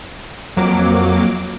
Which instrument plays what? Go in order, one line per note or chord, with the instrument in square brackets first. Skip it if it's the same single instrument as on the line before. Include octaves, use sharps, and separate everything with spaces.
[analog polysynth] F2 F#3 A#3 D6